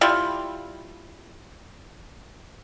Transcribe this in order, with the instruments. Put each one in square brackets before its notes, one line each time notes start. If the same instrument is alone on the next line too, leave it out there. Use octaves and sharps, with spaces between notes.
[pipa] G3 E4 F4